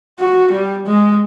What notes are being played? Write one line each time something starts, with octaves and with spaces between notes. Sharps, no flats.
F#4
G3
G#3